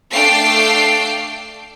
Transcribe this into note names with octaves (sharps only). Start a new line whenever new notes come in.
A3 D4 F5 G5 C7